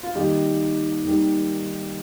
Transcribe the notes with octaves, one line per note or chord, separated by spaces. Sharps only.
F4
D#2 D#3 G3 D#4 G4
D#2 D#3 G3